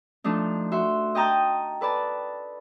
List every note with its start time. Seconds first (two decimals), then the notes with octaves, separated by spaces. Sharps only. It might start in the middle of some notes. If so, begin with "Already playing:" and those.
0.24 F3 A3 D4 D#4
0.72 F#4 E5 C6
1.15 D#5 G5 A5 A#5 D#6 G6
1.81 A4 B4 D5 A5